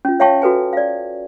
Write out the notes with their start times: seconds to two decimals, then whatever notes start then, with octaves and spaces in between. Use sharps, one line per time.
0.05 C#4 F4
0.20 C#5 E5 F5 G5 A5 C#6
0.42 F#4 A4 B4 G#5
0.73 D5 F5